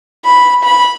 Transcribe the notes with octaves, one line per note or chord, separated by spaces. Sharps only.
B5
B5